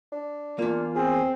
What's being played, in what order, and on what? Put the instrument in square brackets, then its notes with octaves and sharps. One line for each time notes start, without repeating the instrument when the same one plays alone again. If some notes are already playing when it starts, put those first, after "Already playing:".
[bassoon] D4
[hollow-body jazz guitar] E2 A#3 [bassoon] D4 [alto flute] F4
[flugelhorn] C4 [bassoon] G#4